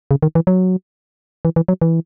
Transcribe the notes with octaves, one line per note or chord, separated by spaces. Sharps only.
C#3
D#3
E3
F#3
E3
E3
F#3
E3